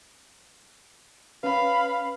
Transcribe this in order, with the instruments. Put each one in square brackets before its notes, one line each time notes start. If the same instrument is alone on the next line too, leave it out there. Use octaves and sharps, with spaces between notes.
[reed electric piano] C#4 B4 [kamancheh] F5 B5